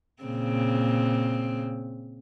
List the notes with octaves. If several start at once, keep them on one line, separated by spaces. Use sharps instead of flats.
A#2 C#3 C4